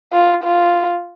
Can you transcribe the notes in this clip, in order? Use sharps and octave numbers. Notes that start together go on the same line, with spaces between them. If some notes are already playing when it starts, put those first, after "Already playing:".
F4
F4